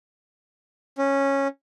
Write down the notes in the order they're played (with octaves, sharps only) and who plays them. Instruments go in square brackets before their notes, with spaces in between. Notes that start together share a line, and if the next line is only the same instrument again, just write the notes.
[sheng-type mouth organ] C#4